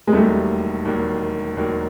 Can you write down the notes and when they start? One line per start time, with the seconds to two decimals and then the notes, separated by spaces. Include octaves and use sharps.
0.07 G#3
0.12 E1 D#2 D#3 F#3 G3 A3 A#3
0.85 E1 D#2 D#3 F#3 A#3
1.56 E1 D#2 D#3 F#3 A#3